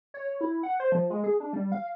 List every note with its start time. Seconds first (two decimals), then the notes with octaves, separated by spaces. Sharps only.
0.14 C#5
0.41 E4
0.63 F#5
0.80 C5
0.92 F3
1.10 G#3
1.24 G#4
1.40 D4
1.53 G3
1.72 F5